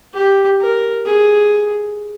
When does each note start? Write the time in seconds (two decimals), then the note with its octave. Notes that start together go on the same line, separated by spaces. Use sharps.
0.14 G4
0.61 A#4
1.06 G#4